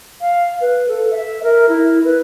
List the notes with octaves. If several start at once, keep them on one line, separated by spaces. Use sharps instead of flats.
F5
B4
A4
E5
A#4
E4
B4